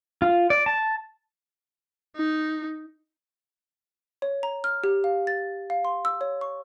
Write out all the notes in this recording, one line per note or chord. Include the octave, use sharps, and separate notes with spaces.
F4
D5
A5
D#4
C#5
A#5
F6
G4
F5
A6
F5
C6
E6
C#5
C#6